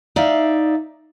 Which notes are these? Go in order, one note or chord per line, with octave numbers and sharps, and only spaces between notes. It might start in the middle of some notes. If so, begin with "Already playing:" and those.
D#4 D5 E5 F5